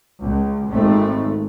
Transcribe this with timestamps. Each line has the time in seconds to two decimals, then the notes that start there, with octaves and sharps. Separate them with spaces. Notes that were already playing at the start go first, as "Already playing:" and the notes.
0.22 C#2
0.71 G#1 A3 C4